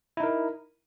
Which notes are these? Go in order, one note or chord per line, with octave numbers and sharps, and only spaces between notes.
D#4 E4 A#4